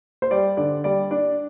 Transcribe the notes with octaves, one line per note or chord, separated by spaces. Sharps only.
C5
G3 D5
D3 D5
G3 D5
D4 D5